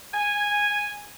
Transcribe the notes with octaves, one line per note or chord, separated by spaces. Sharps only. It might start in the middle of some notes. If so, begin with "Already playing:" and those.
G#5